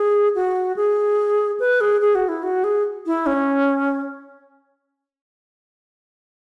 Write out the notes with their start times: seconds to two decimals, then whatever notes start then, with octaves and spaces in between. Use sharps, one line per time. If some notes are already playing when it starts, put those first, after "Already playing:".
Already playing: G#4
0.35 F#4
0.76 G#4
1.60 B4
1.81 G#4
2.01 G#4
2.15 F#4
2.29 E4
2.43 F#4
2.64 G#4
3.06 E4
3.26 C#4